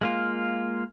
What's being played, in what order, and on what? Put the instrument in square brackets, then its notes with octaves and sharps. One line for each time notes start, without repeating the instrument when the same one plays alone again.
[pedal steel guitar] G#3 A#3 F4